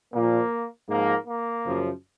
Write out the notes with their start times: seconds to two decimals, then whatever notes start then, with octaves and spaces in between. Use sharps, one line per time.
0.13 A#2 A#3
0.19 F3
0.89 G#2 F3 A#3
1.26 A#3
1.64 F#2 C#3 F3